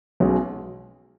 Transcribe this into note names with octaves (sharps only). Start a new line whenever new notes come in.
B1 B2 G#3 C#4